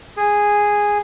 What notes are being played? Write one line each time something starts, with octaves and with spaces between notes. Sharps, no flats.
G#4